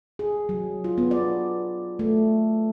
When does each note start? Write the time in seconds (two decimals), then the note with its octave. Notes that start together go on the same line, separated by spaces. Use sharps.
0.19 G#4
0.49 F#3
0.84 F4
0.98 B3
1.11 D5
1.99 A3